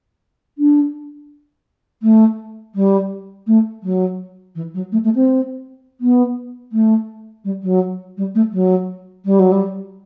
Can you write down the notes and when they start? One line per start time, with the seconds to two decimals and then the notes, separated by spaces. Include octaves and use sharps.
0.58 D4
2.02 A3
2.75 G3
3.47 A3
3.83 F#3
4.55 E3
4.74 F#3
4.92 A3
5.04 A3
5.15 C4
6.01 B3
6.72 A3
7.44 G3
7.63 F#3
8.17 G3
8.35 A3
8.53 F#3
9.25 G3
9.39 F#3
9.52 G3